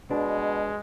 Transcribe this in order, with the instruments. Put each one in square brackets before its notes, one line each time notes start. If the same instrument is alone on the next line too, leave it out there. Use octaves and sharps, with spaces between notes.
[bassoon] B2 [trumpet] G#3 [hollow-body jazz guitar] D4